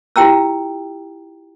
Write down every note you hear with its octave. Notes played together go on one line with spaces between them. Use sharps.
E4 F4 G4 G5 A#5 E6